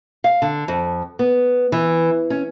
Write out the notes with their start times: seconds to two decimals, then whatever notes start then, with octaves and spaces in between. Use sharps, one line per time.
0.24 F5
0.42 D3
0.68 F2
1.19 B3
1.72 E3
2.30 C#4